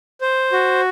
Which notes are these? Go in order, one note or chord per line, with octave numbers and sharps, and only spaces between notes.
C5
F#4